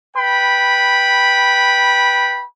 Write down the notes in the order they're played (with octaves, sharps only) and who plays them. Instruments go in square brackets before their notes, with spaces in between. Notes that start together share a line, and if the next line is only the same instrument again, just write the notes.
[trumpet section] B4 G5 B5